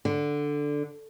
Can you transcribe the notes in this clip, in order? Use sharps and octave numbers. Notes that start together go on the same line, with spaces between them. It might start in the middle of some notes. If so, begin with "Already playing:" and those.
D3